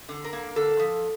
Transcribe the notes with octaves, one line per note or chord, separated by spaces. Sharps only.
D3
A#4
A#3
D3 A4
F3